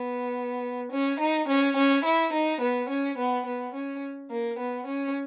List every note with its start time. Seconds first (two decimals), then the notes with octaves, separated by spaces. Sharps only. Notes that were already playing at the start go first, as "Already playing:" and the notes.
Already playing: B3
0.92 C#4
1.20 D#4
1.48 C#4
1.76 C#4
2.05 E4
2.33 D#4
2.61 B3
2.89 C#4
3.18 B3
3.46 B3
3.74 C#4
4.30 A#3
4.59 B3
4.87 C#4